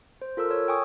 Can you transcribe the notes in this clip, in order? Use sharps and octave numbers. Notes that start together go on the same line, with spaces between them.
C5
F4 A4 A#4 E6
C#5 E6
G5 G#5 C#6 D#6